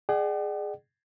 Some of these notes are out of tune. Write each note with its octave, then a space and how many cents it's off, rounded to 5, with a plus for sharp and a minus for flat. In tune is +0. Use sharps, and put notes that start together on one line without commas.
G#4 +0 D5 +35 F#5 +45